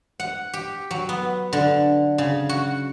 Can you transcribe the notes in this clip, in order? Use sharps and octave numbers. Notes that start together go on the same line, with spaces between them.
F#5
G4
F#3
B3
D3
C#3
F#4